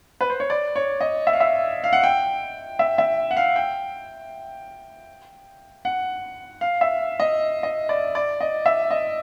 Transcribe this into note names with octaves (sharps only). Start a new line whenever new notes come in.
B4
C5
C#5
D5
C#5
D#5
E5
F5
E5
F5
F#5
G5
E5
E5
F#5
F5
G5
F#5
F5
E5
D#5
D#5
D5
D5
D#5
E5
D#5